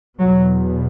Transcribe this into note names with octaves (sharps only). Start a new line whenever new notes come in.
E2 B2 F#3